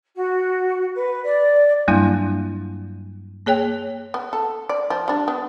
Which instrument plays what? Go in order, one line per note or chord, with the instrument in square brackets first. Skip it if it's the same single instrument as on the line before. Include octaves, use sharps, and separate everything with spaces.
[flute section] F#4
B4
D5
[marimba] G2 F#3 G3 A#3 D4 E4
A#3 G#4 C#5 G5
[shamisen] B3
A4
D5
F3
G3 D4
B3